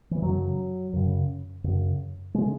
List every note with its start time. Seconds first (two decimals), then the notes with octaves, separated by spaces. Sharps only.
0.11 E3
0.22 F#2 C#3 F#3
0.93 F#2 C#3
1.64 F#2 C#3
2.34 C#3 G#3